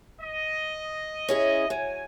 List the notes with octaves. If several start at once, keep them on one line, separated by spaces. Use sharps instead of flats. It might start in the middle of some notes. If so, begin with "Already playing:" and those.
D#5
C#4 E4 G#4
F#3 G#5